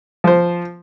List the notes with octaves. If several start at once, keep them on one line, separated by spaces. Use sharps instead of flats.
F3 C5